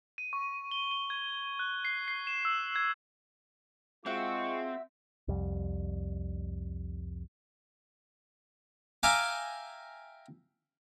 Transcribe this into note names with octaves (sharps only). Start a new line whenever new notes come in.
D#7
C#6
G7
G7
G#6
F#6
C7
C7
E7
E6
G#6
G#3 C4 F4 F#4 E5 C#6
C2 F2 G3
E5 F5 G5 G#5 A#5 D6